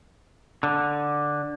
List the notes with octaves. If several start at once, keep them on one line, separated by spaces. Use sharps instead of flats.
D3